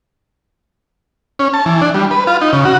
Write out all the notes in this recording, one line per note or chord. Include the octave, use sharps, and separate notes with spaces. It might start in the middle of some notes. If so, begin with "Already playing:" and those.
C#4
A5
E3
D4
G3
B4
F4
D#4
C#3
F#4